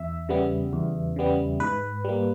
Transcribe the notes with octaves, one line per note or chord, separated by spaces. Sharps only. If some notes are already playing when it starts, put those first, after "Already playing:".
Already playing: E2 E5
C#3 G3 B3
E2
C#3 G3 B3
G#2 B4
G3 A#3